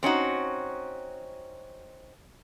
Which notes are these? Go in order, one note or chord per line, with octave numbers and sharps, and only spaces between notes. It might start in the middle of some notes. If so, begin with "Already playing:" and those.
C4 C#4 D#4 F#4